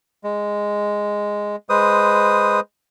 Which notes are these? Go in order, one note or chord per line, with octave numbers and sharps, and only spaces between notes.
G#3
G#3 B4 C5 D#6